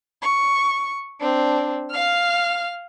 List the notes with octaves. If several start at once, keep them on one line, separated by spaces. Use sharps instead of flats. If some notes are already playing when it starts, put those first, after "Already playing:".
C#6
C4 D4
F5 F6